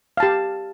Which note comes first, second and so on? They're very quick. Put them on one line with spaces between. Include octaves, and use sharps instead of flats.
F5 A5 G4